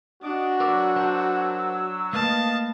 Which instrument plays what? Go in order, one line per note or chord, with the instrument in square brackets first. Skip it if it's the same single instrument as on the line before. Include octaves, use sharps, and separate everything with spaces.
[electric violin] D4 [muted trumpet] F#4 [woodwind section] D#5 D6
[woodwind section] F#3 E6 [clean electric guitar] A#4 B4 D5
[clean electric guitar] A#4 C5 A5
[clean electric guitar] A3 A#3 [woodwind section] B4 D#5 F5 [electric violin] A5